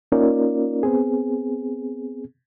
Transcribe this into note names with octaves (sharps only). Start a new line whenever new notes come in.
A#3 C#4 D#4 F4 A#4 D5
B3 C4 G#4